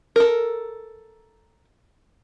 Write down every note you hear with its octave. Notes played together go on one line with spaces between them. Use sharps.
A4 A#4